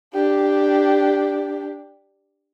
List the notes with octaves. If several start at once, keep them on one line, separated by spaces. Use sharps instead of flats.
D4 G4